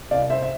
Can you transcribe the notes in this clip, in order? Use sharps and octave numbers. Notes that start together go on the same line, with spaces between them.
C2 D5 F5
C5 E5
E5